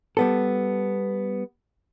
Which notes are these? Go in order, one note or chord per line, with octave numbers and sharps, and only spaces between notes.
G3 B3 A4